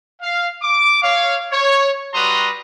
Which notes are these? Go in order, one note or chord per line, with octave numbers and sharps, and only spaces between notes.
F5
D6
C#5 F5
C#5
G3 F#4 B4 A#5 C6 D#6